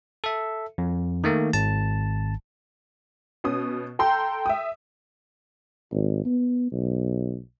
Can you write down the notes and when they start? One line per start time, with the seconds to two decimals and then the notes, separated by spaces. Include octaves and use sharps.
0.24 A4 E5
0.78 F2
1.24 D#3 A3 A#3
1.53 G#1 A5
3.44 B2 C#4 D#6
3.99 A4 G5 A#5 C6
4.46 E5 D#6
5.92 G#1
6.25 B3
6.72 B1